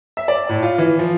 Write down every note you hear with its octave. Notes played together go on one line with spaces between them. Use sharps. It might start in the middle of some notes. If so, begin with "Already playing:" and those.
E5
D5
A2
F4
E3
F3